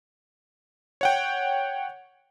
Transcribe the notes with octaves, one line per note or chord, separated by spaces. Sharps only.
C#5 F#5 G5